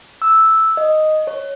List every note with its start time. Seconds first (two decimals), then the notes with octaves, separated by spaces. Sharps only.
0.22 E6
0.77 D#5
1.27 C#5